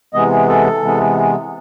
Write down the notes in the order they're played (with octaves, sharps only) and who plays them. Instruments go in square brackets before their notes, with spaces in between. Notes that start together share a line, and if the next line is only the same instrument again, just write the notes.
[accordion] C3 E3 G#3 B3 D#5
A4
C3 E3 G#3 B3